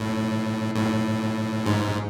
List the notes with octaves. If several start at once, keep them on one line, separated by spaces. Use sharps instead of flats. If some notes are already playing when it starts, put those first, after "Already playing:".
Already playing: A2
A2
G#2